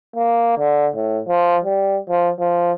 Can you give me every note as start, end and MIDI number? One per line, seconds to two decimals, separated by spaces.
0.16 0.53 58
0.58 0.87 50
0.95 1.20 45
1.28 1.58 53
1.64 1.98 55
2.09 2.30 53
2.39 2.72 53